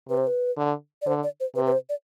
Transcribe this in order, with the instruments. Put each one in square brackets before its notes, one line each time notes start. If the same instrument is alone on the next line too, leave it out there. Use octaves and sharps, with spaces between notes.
[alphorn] C3 [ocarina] B4
[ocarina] C5
B4
[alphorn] D3
[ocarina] D5
[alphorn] D3 [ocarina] C5
[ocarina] D5
C5
[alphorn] C3 [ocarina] B4
[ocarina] B4
C5
D5